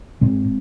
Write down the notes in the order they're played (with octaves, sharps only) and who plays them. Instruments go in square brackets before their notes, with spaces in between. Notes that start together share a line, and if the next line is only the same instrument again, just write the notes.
[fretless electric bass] G#2 G#3 C4